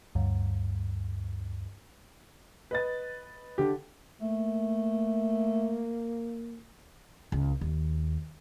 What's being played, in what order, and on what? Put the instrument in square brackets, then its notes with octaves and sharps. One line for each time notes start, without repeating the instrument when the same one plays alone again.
[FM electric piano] D2 G2
[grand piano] B4 D#5 A6
D3 G4
[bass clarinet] A3 [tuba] A#3
[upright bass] C#2
D#2